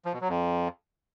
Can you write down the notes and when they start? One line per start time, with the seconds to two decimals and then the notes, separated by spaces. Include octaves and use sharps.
0.05 F3
0.13 B2
0.21 F#3
0.29 F2